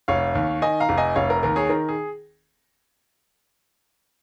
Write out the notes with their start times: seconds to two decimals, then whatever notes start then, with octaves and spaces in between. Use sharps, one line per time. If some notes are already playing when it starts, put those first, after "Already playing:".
0.08 F1 C#5 F5
0.35 D#2
0.62 D#3 D#5 G#5
0.80 F5 A#5
0.89 F1
0.98 D#5 G#5
1.16 F1 C#5 F5
1.30 A#4
1.43 D#2 A#4
1.56 G#4 C#5
1.69 D#3 A#4
1.89 G#4